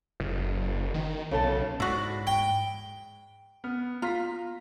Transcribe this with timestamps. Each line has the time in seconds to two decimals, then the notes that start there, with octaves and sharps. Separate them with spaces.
0.20 F#1
0.94 D#3
1.31 B1 C#3 A4 A5
1.80 G#2 E4 F#4 D5
2.27 G5
3.64 B3 F6
4.02 F4 A#5 B6